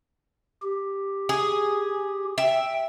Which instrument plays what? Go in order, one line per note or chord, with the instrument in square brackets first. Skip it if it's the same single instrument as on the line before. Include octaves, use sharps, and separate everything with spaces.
[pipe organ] G4
[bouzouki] G#4
[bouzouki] E5 [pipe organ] G5